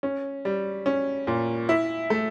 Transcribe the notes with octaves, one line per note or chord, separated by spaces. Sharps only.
C#4
G3
C#4
A#2
E4
A3